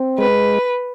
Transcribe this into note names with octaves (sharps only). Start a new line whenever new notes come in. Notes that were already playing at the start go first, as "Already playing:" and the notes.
Already playing: C4
G#3 B4